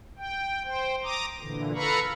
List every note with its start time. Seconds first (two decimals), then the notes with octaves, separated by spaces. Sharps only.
0.17 G5
0.64 C5 G5
1.04 A#5 D6 D#6
1.40 A#2 D3 E3
1.75 A4 B4 F5 A#5 B5 C#6